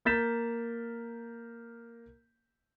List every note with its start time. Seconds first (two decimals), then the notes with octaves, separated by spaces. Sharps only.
0.05 A#3 A#4 G6 A6 B6 E7